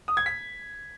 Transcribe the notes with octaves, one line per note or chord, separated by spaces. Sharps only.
D#6
G#6
B6